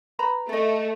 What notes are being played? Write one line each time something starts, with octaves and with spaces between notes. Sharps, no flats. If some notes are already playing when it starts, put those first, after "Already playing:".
B4 A#5 B5
A3 A4 D#5